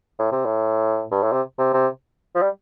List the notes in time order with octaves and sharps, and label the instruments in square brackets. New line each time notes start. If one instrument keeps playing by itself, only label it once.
[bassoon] A2
C3
A2
G2
A2
C3
C3
C3
F3
G3